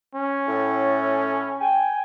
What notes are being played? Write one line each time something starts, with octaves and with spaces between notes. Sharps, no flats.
C#4
A2
G5 G#5